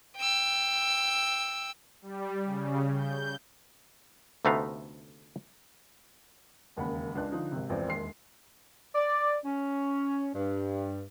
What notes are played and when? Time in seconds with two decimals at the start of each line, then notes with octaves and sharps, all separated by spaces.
0.17 G5 E6
2.02 G3
2.45 C#3
2.94 G6
4.45 D2 C3 A3 B3 D#4 F5
6.77 E1 D#2 C#3 A#3 F#5 B5
7.15 C#2 D4 F#6
7.32 D3 F3 D#4
7.52 G#1 C3
7.69 E1 A1 F3 C4 D5
7.87 E1 D#2 C6 C7
8.95 D5
9.45 C#4
10.34 G2